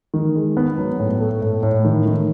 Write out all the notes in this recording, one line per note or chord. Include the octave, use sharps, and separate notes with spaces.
D#3
G#3
B3
F#3
A2
A3
A2
A2
D#3
D#3